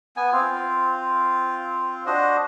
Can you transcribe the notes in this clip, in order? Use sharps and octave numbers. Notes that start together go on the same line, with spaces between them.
B3 G#5
C4 F4
D4 F#4 C5 D#5